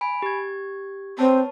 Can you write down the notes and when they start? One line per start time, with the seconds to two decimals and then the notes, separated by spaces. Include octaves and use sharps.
0.01 G#5 B5 D7
0.22 G4 G#6
1.19 C4 B4 C#5 A5